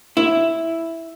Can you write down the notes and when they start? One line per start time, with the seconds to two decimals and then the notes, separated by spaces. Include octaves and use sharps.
0.17 E4